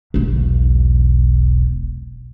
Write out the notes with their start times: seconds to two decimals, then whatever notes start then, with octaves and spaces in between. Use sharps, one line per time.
0.14 E1 B1